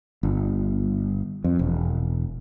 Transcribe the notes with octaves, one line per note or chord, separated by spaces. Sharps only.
G1
F2
E1